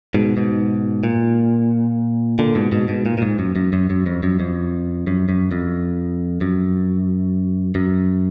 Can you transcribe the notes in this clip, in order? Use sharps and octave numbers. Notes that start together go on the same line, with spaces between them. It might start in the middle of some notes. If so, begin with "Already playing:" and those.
G#2 B2
G#2 B2
A#2
A#2 D3
G#2 B2
G#2 B2
G#2 B2
A#2
A#2
G#2
F#2
F#2
F#2
F#2
F2
F#2
F2
F#2
F#2
F2
F#2
F#2